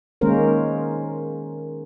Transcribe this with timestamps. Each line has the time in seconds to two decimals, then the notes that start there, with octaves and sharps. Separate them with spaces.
0.21 D#3 G#3 A#3 C#4 A#4 C5